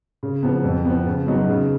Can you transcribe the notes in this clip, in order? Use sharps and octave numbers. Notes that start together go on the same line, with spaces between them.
C#3
F3 B3
F2
F3 B3
C#3
F#3 B3 D#4
C#3